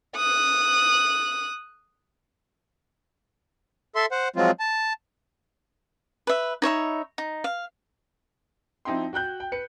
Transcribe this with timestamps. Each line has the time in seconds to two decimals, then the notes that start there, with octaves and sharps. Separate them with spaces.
0.16 D#6 F#6
3.96 A4 E5 C6
4.12 C5 F#5
4.36 F3 F#3 G#3 C4 F4
4.60 A5
6.27 B4 E5
6.62 D#4 C#5 E5 B5
7.18 D#4
7.44 F5
8.85 F3 C4 D#4 E4 G5 C6
9.13 F#4 G5 F#6 G6
9.40 G5
9.52 B4 C#7